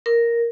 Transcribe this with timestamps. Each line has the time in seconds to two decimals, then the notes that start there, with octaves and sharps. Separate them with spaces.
0.06 A#4